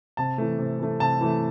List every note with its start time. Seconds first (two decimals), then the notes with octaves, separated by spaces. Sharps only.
0.17 C3 A5
0.38 E3 A3
0.58 C3
0.79 E3 A3
1.00 C3 A5
1.21 E3 A3